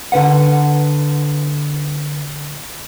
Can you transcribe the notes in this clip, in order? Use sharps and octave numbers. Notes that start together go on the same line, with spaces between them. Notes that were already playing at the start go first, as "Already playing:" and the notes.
D3 B4 F#5